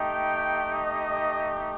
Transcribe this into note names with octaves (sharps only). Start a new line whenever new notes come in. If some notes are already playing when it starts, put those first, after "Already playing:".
Already playing: A3 D#4 G4 G5
D#5